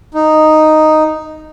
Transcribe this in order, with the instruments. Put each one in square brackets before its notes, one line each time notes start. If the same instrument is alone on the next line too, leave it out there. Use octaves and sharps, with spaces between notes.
[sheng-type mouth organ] D#4